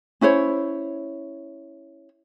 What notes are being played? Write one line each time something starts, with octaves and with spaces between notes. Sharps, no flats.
C#4 E4 C5 C#5